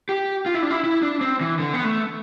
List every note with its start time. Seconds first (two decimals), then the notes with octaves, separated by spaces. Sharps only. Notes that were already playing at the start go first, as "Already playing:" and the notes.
0.09 G4
0.46 F4
0.54 E4
0.62 D4
0.70 E4
0.84 E4
1.03 D4
1.21 C4
1.41 E3
1.59 D3
1.73 B3
1.84 A3